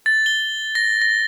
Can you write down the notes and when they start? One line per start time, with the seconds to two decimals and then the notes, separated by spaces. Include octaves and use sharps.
0.06 A6
0.26 G7
0.75 A#6
1.02 A#6